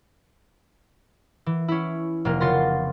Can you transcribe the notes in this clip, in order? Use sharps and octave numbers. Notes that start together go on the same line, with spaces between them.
E3
C#4 E4
F1 C3 A#3 A#4
C#3 B3 F4 C6 A6 A#6